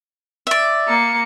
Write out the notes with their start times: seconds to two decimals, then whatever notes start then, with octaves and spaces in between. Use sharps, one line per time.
0.47 D5 E5
0.88 A#3 C#7